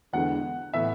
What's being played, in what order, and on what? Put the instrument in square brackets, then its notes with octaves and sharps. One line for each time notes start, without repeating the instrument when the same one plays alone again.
[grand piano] E2 D3 G#3 B3 [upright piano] F#5
[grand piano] A2 E3 B3 [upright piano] E5